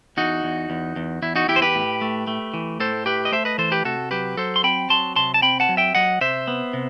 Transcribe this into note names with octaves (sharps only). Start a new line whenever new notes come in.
E2 D#4 F#4
E2
E2
E2
E2 E4
D#4 F#4
E2 E4 G4
C5
G4 B4
A2
A3
A3
E3
A2 A4 C5
A3 G4 B4
D#5
A3 C5 E5
B4 D#5
E3 A4 C5
G4 B4
C3 F#4 A4
F#3 G4 B4
F#3 A4 C5
C6
C4 G5 B5
F#3 A5 C6
C3 A5 C6
A5
C4 G5 B5
F#5 A5
F#3
E5 G5
F#3 D#5 F#5
C3 C5 E5
B3
C3